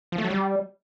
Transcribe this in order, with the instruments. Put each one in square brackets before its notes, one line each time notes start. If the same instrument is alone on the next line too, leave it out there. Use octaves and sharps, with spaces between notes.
[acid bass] F3
A3
F#3
G3